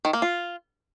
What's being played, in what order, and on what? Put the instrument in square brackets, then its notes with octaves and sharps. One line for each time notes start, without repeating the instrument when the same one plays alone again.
[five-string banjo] D#3
A#3
F4